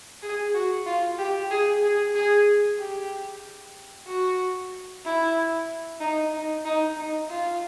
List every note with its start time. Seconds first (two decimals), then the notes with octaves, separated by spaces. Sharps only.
0.22 G#4
0.54 F#4
0.86 F4
1.18 G4
1.51 G#4
1.83 G#4
2.15 G#4
2.79 G4
4.07 F#4
5.05 E4
6.00 D#4
6.33 D#4
6.65 D#4
6.97 D#4
7.29 F4